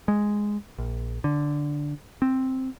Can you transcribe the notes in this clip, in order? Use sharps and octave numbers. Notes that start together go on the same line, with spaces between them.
G#3
A#1
D3
C4